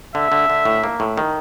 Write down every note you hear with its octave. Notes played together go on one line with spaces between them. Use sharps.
D3 E5
D3
D3
A2
A#3
A2
D#3